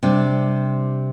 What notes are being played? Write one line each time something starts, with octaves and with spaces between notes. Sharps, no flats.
C3 G3 D4